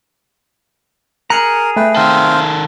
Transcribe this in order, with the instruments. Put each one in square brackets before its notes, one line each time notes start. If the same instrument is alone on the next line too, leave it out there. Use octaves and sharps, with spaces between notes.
[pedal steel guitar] G#4 A#5 [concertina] A#4 [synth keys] F#6 C#7
[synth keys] A3 [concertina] B4 G5
[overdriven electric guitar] D#3 A4 [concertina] C4 F5 G5